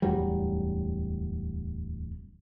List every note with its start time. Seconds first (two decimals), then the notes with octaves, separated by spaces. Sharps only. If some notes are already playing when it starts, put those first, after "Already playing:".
0.02 D1 E2 F#3 G3